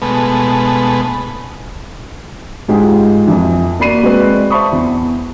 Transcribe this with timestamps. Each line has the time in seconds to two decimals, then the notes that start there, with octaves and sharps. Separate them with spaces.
0.02 B2 G#3 A3 B3
2.68 G#2 G#3 F4 G4 G#4
3.28 F2 E3
3.79 A#3 F#4 D5 B5 C7 D#7
4.03 G#3 C4 F#4 B4 D5
4.50 C5 E5 A5 B5 C#6 D#6
4.72 E2